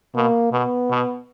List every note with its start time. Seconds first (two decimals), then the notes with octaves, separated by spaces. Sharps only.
0.15 B2 A#3
0.52 B2 B3
0.90 B2